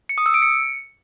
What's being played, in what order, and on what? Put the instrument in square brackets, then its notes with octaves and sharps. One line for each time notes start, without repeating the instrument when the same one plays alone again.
[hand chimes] C#7
D#6
E6
D7
C#7